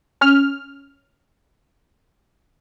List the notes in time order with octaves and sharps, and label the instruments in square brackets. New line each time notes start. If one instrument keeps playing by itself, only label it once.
[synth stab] C#4 F6